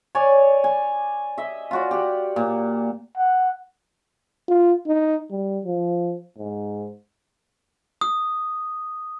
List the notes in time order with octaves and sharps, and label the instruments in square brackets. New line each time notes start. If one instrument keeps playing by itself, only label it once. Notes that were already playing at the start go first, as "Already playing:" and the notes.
[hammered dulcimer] C#5 D5 G#5
G#5
D#5 E5
F4 F#4 D5
G4 F#5
A#2
[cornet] F#5
[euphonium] F4
D#4
G3
F3
G#2
[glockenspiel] D#6